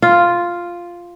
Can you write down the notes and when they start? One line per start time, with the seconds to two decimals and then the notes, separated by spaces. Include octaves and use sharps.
0.02 F4